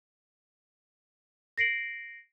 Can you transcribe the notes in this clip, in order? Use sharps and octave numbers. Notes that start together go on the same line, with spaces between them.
A#6 C7 D7 F#7